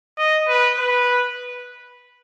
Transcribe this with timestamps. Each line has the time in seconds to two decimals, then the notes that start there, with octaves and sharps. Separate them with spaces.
0.19 D#5
0.49 B4
0.79 B4